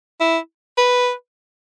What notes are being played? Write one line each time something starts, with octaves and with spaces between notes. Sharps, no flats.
E4
B4